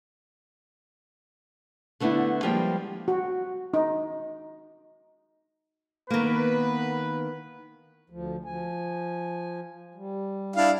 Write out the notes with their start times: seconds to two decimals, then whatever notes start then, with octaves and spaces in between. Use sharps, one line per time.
2.00 D3 A3 B3 D4 E4
2.43 F3 G3 G#3 A#3 G5
3.08 F#4
3.74 D#4
6.10 D#3 A#3 B3 B4
8.10 D2 F3
8.45 F3 G#5
9.95 G3
10.56 D4 E4 F5